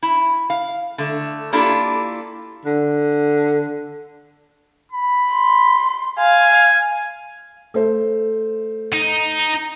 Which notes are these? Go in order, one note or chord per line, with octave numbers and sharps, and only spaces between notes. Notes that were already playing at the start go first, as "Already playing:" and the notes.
E4
F5
D3 A3
A#3 D4 E4 F4 G4 A4
D3
B5
C6
F5 G#5
A3 C5
D#4